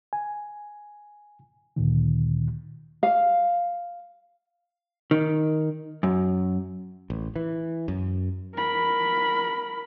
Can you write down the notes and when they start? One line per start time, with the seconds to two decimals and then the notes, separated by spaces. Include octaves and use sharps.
0.13 G#5
1.76 D2 A#2 D#3
3.03 F5
5.11 D#3
6.03 F#2
7.10 A1
7.36 E3
7.88 F#2
8.56 A#4 B5